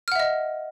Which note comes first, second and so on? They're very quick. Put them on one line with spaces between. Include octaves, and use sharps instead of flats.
F6 F#5 E5 D#5